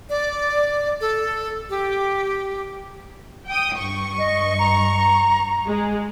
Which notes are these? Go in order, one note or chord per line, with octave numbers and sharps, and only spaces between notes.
D5
A4
G4
G5 D#6
G2 C#6
D#5
A#5
G#3